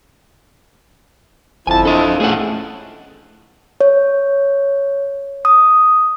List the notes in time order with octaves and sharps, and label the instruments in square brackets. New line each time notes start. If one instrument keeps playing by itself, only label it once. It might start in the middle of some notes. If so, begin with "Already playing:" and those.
[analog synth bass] G1 [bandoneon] F2 F3 [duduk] E4 [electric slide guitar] G#5 A5
[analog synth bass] D4 [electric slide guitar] A4 D#5
[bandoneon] E2 [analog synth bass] A3 [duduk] C#4 [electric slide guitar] G#4 A4 F#5
[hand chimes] C#5
D#6